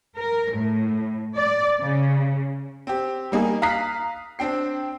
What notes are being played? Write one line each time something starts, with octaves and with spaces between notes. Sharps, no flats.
A#4
A2
D5
C#3
C4 G4
G3 A#3 D#4 G#4
F5 A#5 D#6 F#6 B6 C7
C4 D4 G5 C7